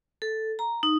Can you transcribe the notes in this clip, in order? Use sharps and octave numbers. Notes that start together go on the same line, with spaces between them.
A4
A#5
D#4